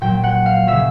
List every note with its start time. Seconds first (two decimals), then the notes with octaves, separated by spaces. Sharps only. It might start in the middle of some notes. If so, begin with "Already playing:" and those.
0.01 A#2 F#3 G5
0.24 F#5
0.46 F5
0.67 C#3 F#3 E5